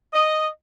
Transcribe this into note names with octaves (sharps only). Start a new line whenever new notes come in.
D#5